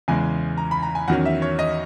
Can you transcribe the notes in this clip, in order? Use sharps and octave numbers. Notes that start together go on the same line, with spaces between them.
E2 C#3 E3 G#3 G#5
A#5
B5
A#5
G#5
E2 D#3 F#3 C#4 F#5
E5
C#5
D#5